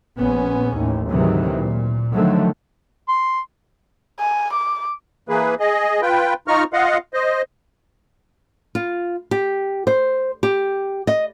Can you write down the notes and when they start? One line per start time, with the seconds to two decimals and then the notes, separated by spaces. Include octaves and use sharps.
0.18 A#1 B3 C#4
0.75 A1 D#2
1.10 D2 G#2 C3 D#3 E3 F#3
1.51 A#2
2.15 D3 D#3 F3 F#3 A3
3.09 C6
4.20 G#5
4.53 D6
5.29 E3 A#3 G#4 B4
5.60 G#4 D#5
6.02 F4 B4 G5
6.48 D#4 F4 A#5 C#6 F6
6.73 F4 D#5 F5 F#5
7.14 C5 D#5
8.75 F4
9.31 G4
9.87 C5
10.43 G4
11.07 D#5